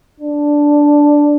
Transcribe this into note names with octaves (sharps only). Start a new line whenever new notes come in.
D4